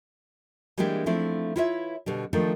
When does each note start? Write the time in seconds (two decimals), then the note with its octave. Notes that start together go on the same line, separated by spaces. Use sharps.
0.78 E3 G3 G#3 A#3 D4 G4
1.06 F3 A3 C4 D4 E4
1.56 E4 F4 B4 C#5 D#5 E5
2.06 B2 D3 G3
2.33 D#3 F3 A3 D4